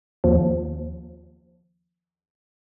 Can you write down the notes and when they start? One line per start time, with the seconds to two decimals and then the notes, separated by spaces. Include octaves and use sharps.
0.24 D#2 F3